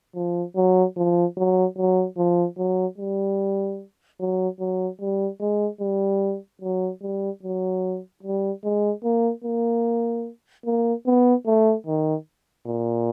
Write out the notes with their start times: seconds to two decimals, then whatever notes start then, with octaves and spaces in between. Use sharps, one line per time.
0.15 F3
0.56 F#3
0.97 F3
1.37 F#3
1.78 F#3
2.18 F3
2.58 F#3
2.98 G3
4.20 F#3
4.60 F#3
5.01 G3
5.40 G#3
5.81 G3
6.62 F#3
7.02 G3
7.43 F#3
8.23 G3
8.64 G#3
9.04 A#3
9.45 A#3
10.65 A#3
11.07 B3
11.46 A3
11.86 D#3
12.67 A#2